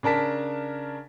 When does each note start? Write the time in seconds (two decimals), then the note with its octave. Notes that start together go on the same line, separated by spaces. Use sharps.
0.03 C#3 D4 A#4 A5 B6